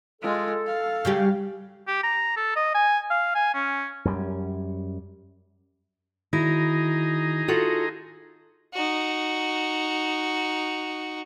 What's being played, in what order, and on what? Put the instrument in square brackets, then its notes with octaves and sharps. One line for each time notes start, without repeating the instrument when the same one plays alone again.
[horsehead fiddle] G#3 F4 [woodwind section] A4
[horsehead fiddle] F5
[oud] C#3 G3 G4
[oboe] G4
A#5
A4
D#5
G#5
F5
G#5
C#4
[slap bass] F#2 G3
[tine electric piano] D#3 F#4 A#6 [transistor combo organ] D#4 G#4 A#5 [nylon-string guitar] E4
[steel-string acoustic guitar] F4 F#4 A4
[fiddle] D#4 F#4